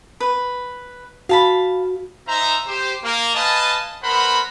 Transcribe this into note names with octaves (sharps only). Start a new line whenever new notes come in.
B4
F#4 F5 A5 B5
D#4 C5 E5 A#5
G4 C5
A#3
B4 D#5 F5 G#5 A5
B3 A#4 C5 F#5 A#5 B5